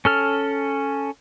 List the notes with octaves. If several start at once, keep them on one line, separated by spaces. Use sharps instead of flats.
C#4 A4 F6